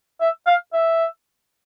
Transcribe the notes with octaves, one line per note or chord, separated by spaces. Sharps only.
E5
F5
E5